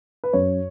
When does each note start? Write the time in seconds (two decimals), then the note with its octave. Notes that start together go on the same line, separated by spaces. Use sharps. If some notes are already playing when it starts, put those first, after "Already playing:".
0.24 B4
0.33 F#2 C#5